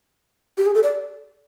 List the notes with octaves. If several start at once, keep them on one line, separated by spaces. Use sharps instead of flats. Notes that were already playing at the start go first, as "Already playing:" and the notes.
G4
G#4
A4
D5